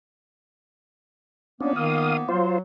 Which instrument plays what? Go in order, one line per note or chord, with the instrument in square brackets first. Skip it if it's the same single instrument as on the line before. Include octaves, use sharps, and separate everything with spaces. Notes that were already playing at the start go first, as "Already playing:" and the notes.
[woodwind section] F3 A#3 B3 [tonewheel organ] C#4 D4
[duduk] D#3 [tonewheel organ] F5 D#6
[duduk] F#3 [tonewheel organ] F4 C5